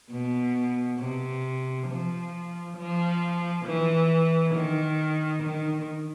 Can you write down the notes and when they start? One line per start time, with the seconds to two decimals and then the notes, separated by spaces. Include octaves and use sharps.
0.10 B2
0.98 C3
1.88 F3
2.77 F3
3.65 E3
4.55 D#3
5.43 D#3